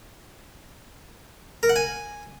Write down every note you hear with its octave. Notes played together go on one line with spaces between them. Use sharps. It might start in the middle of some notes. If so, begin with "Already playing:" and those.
A#4
F#5
G#5